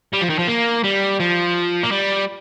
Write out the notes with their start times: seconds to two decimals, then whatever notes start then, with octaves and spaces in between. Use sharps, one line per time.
0.13 G3
0.21 F3
0.29 D#3
0.39 F3
0.48 A#3
0.84 G3
1.20 F3
1.83 A#3
1.91 G3